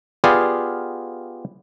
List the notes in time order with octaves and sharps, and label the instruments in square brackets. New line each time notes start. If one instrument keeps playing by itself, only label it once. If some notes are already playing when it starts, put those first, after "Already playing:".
[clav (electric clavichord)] B3 F4 G4 G#4 D5 F5